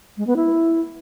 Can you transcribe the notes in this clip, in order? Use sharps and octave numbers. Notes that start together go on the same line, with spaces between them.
G#3
B3
E4